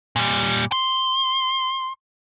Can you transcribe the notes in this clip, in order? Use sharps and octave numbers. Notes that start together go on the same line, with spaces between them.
A#2 G3
C6